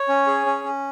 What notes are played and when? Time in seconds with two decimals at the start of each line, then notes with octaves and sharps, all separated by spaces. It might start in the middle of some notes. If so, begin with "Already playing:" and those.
Already playing: C#5
0.08 C#4
0.27 G#4
0.46 C#4
0.64 C#4